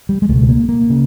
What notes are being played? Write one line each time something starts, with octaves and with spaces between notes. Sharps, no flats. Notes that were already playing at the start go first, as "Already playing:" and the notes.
G3
G#3
C#2 B2 A3
A#3
A#3
C#3